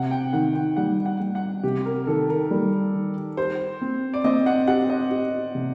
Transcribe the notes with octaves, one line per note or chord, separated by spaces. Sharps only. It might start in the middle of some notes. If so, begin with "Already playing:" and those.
Already playing: C3 F#5
G5
D#3 F#5
G5
G3 F#5
F#5
G3
F#5
C3 G4
A#4
D#3 A4
A#4
G3
D#3
G4 C5
C4
D5
C4 D#5
F#5
G4 F#5
D#5
G4
C3